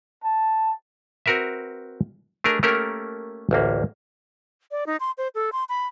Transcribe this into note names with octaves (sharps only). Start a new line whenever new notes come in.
A5
C4 F#4 A#4 B4 E5
A3 D4 G#4 A#4
A3 A#3 C#4 G4 A4 A#4
A1 D2 A#3
D5
D#4
C6
C5
A4
C6
B5